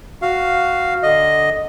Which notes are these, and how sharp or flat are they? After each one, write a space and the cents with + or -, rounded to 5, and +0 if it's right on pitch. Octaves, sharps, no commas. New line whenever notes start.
F#4 +0 F5 +0
D3 +0 D#5 +0